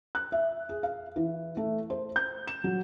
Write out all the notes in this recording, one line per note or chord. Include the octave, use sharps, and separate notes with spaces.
F#6
E5
G#4
F5
E3
A3
C5
G6
E7
F#3